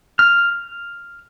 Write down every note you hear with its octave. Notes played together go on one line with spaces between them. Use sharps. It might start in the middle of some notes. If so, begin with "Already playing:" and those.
F6